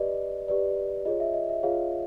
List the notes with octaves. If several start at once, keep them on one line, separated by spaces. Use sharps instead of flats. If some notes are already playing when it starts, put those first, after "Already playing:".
Already playing: G4 B4 D5 D#5
G4 B4 D5
F4 G#4 C#5 D#5
E5
D#5
E5
F4 G#4 C#5 F5